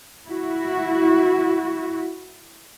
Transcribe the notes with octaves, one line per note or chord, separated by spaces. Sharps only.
E4 F#4